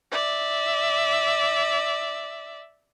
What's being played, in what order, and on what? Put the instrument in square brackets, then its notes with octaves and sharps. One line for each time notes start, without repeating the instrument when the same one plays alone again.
[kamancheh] D5 E5